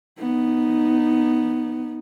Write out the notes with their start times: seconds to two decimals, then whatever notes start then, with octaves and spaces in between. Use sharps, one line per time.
0.20 B3 D#4